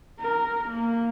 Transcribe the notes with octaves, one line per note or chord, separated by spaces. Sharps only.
A#4
A#3